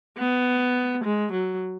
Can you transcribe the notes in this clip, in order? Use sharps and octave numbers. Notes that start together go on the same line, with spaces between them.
B3
G#3
F#3